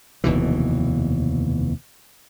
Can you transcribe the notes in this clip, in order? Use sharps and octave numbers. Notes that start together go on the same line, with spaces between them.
F1 D#2 B2 E3